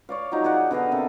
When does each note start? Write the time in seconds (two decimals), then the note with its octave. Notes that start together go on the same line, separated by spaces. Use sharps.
0.09 C#5 D5 F5
0.32 F3 F#3 D#4
0.44 G#4 D5 F#5
0.71 D3 B3 D#5 F5
0.92 C3 A4 A#4